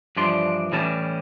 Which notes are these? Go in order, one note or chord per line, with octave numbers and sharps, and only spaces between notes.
G2 E3 F3 D4 D5 C6
A2 E3 G3 C#4 A5